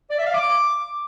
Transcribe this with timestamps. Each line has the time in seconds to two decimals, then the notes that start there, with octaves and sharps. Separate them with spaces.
0.10 D5
0.18 E5
0.26 F5
0.34 D6